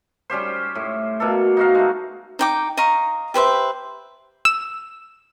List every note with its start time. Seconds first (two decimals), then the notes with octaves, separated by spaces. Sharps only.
0.30 G3 C#4 G4 C5
0.75 A2
1.20 B2 A#3 A4
1.57 D#4 F#4 F5
1.74 G#3 A3
2.39 D#4 G5 D6
2.77 D#5 F5 A#5 C#6
3.34 G4 B4 C5 E5
4.45 E6